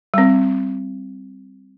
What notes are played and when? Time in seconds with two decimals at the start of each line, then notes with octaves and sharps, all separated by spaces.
0.14 G3 C4